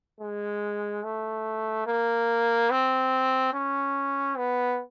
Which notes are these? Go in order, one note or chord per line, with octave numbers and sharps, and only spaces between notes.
G#3
A3
A#3
C4
C#4
B3